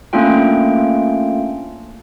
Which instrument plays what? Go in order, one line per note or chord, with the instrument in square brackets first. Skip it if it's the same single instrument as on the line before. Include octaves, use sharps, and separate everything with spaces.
[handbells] A3 A#3 C#4 D4 F4 G5